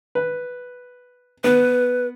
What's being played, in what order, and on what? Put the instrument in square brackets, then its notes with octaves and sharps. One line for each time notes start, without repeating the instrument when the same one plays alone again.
[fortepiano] B4
[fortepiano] B3 [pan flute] B4